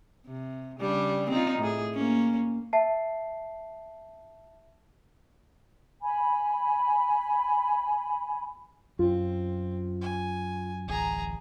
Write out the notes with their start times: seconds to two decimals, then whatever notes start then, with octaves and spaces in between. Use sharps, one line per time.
0.26 C3
0.80 C#3 G3 D4
1.30 C4 D#4 F4
1.59 A2 G#4
1.94 A#3 C#4
2.73 E5 A5 C7
6.02 G#5 B5
8.99 F#2 C4 F4
10.02 G#5
10.88 D1 A1 G#4 A#5